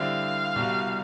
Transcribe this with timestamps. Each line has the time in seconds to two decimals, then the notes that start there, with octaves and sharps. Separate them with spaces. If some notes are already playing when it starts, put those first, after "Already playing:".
Already playing: D3 G3 C4 E4 F5
0.56 C2 B2 G3